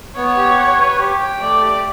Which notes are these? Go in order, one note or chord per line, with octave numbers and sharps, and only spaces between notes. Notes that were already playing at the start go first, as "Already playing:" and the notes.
B3 C#5
G4
F#5
B4
G4
G5
A3 D5
G4